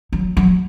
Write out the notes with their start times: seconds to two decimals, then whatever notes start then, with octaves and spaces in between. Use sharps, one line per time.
0.13 F#3
0.37 F#3